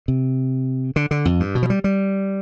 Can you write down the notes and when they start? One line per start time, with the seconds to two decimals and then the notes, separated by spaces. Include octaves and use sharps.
0.08 C3
0.96 D3
1.11 D3
1.25 F2
1.40 G2
1.55 B2
1.63 F3
1.70 G3
1.84 G3